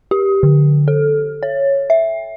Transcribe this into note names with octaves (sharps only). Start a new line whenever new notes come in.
G4
D3
A4
C#5
E5